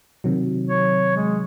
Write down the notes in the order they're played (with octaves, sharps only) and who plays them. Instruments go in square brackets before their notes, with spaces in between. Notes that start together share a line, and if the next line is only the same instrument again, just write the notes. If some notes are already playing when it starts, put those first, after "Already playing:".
[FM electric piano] C3 D#3 F#3
[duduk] C#5
G#3